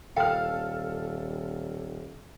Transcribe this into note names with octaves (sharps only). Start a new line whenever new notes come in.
D#1 A4 F5 G5 A#5 F6